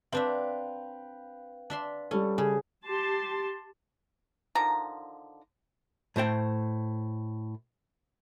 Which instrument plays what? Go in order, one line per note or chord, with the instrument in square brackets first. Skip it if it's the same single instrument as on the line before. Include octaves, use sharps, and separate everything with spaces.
[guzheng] C4 D4 E5 [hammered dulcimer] B4 F5 G5
[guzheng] D4 E5 C6
[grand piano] G3 A4 [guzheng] C#4
[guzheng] C#3 [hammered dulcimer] G#4
[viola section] G4 A5 C6
[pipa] D3 D#3 F3 A#5
[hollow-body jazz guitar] A2 A3 C5 G5